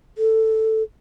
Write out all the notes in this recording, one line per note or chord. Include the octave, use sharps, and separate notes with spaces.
A4